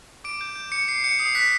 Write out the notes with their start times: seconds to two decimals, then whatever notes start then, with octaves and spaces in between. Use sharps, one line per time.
0.24 D6 D7
0.41 G6
0.55 G6
0.72 D6 C#7
0.88 D6 C7
1.04 G6 C#7
1.19 D#6 C7
1.35 F#6 B6